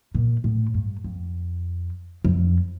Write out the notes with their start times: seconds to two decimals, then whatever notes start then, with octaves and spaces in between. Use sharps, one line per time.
0.14 A#2
0.44 A2
0.74 G2
1.04 F2
2.25 F2